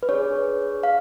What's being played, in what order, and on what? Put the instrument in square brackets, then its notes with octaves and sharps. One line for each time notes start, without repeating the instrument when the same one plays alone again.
[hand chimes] B4
D4 G#4 C#5
F5